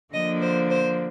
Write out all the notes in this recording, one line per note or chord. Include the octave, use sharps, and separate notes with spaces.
D3 F3 A#3 D#5
C5
C5